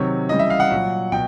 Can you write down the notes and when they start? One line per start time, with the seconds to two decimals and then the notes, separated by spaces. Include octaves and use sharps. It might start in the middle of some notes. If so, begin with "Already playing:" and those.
Already playing: C3 D#3 F#3 C#5
0.29 C#3 E3 G3 D#5
0.39 E5
0.50 F5
0.60 F#5
0.70 A#2 F#3
1.12 B2 G5